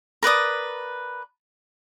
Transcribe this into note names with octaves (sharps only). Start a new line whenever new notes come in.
A#4 B4 D5 D#6